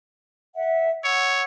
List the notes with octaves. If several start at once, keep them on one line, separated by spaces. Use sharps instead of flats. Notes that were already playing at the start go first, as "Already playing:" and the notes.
E5 F#5
C#5 F#5 E6